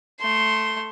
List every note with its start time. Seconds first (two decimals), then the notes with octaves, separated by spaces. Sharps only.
0.20 A3 C6